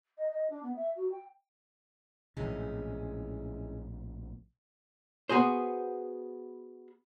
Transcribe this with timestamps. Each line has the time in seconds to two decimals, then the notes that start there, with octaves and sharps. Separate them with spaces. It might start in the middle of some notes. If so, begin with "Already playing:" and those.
0.18 D#5
0.31 D#5
0.50 D4
0.63 B3
0.76 E5
0.96 F#4
1.11 G5
2.37 A#1 A2 C3 E3 G#3 C#4
5.29 B3 F#4 G#4 C5